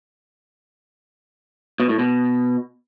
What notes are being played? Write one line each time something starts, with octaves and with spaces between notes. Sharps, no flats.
B2
A2
B2